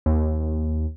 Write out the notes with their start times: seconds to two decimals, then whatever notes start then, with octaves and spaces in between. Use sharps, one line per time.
0.06 D#2